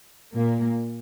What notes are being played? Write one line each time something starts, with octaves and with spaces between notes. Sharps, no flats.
A#2 A#3